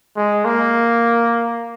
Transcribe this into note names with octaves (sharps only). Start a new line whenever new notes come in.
G#3
A#3